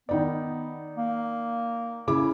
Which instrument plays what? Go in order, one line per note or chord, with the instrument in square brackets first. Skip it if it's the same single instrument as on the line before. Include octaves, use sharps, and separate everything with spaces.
[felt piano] D#3 D#4 D5 [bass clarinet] B3
[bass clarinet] A#3
[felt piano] C#3 E4 D6